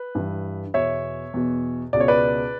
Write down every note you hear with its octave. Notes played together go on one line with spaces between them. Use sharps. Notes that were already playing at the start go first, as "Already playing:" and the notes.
Already playing: B4
G2 E3
E2 B2 C#5 E5
E2 B2
C#2 B2 D5
C#5
B4 D5